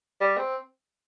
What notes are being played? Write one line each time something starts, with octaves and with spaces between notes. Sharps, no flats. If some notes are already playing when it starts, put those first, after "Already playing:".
G3
C4